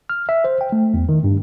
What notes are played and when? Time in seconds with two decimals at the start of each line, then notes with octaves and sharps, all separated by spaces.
0.10 F6
0.29 E5
0.44 C5
0.61 G5
0.72 A3
0.94 E2
1.09 D#3
1.24 G2